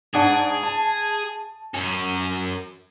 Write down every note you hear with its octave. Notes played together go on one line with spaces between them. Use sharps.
G#2 D4 G#4 F#5
A5
F#2 C#4